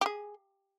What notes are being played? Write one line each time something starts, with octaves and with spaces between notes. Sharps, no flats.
G4
G#4